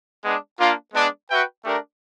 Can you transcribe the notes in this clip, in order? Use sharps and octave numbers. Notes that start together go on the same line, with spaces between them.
G#3 B3 D4
A#3 D4 F4
G#3 B3 D4
F#4 B4 E5 G5
A3 D4 G4 A#4 D5